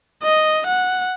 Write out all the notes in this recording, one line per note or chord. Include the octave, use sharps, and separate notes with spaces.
D#5
F#5